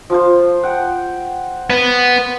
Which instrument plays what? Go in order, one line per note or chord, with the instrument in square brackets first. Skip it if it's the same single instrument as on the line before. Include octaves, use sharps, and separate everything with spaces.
[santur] F3 F4 C5
F#5 G5
[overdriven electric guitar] B3 B4